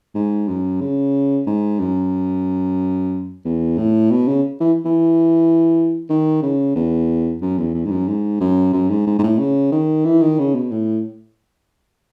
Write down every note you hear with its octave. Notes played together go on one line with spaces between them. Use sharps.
G#2
F#2
C#3
G#2
F#2
E2
A2
B2
C#3
E3
E3
D#3
C#3
E2
F#2
E2
E2
G#2
F#2
G#2
F#2
F#2
G#2
G#2
G#2
A2
C#3
D#3
E3
D#3
C#3
B2
A2